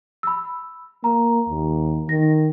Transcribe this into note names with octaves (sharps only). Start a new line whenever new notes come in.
B5 E6
A#3 A#5
D#2
D#3 A#6